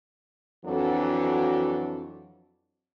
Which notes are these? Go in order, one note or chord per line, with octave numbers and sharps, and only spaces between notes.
F2 E3 F#3 D4 F#4 A4